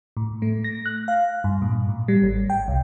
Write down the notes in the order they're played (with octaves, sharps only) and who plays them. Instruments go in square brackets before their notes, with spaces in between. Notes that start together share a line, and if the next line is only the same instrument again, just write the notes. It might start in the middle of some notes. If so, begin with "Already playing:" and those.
[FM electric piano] A2
A3
A#6
F#6
F5
G2
A#2
A2
G3
G#1
G5
C2